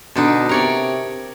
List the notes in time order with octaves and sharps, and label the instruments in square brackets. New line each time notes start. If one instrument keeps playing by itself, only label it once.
[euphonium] B2 [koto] D3 D4 D#4
[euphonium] C3 [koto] A#4 C#5 D5